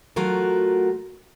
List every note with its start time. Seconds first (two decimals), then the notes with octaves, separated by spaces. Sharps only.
0.16 F#3 A3 F4 F#4 A#4